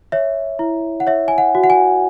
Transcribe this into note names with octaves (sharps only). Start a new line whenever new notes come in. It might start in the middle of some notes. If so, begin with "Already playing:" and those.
C#5 E5
E4
F#5
C#5 E5
G#5
F#5
F#4
F#5
G#5